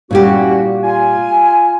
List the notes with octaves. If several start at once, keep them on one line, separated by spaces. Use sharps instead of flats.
A#2 G3 C#4 E4 F#4 G4
F4 G#5